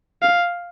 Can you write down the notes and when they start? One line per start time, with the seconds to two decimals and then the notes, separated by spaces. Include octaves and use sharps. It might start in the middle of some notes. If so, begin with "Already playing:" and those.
0.22 F5